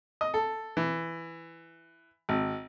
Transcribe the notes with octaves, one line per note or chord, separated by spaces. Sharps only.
D#5
A4
E3
G#1